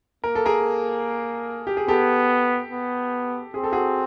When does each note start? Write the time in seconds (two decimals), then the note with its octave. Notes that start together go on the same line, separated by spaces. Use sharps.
0.24 A#3 A#4
0.35 A4
0.46 G#4 A#4
1.67 G4
1.77 G#4
1.88 B3 G4 A4
2.71 B3
3.54 C4 G#4
3.64 A4
3.72 F#4 G#4